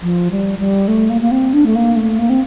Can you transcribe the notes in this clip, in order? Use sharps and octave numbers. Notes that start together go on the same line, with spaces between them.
F3
G3
G3
A3
A#3
A#3
C4
D4
A3
A#3
A3
A#3
C4